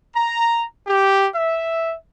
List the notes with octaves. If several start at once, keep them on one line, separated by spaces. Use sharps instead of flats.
A#5
G4
E5